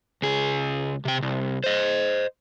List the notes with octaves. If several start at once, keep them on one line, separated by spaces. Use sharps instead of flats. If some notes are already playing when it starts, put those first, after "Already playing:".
C#2 G#4
C3 G5
C2
C5 D#5